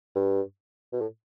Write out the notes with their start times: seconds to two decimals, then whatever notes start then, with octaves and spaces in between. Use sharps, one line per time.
0.15 G2
0.93 B2
1.01 A2